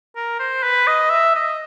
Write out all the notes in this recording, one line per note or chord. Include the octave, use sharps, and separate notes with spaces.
A#4
C5
B4
D#5
E5
D#5